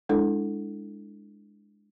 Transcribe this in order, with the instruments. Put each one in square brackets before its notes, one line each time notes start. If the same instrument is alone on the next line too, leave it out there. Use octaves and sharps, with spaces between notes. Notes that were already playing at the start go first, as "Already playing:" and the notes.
[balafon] G#3 D4 E4 A4